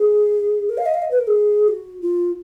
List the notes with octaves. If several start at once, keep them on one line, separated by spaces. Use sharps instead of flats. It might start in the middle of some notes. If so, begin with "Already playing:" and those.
Already playing: G#4
A#4
F5
D#5
F5
D#5
B4
A#4
G#4
F#4
F4